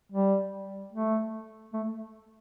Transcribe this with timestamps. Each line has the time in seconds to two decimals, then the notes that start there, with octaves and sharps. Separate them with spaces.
0.12 G3
0.93 A3
1.73 A3